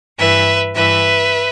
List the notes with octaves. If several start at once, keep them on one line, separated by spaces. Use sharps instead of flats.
G2 E3 B4 E5
G2 E3 B4 E5